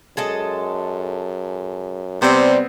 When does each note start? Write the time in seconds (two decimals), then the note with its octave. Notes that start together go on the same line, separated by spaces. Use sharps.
0.17 F#2 G#3 A4 D#5
2.22 C3 G3 B3 C4 C5 D5